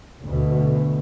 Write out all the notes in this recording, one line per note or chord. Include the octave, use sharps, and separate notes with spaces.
D2 B2